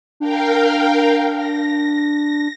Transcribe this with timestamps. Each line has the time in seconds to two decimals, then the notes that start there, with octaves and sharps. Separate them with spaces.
0.20 D4 A#4 F5 G5
1.34 A#6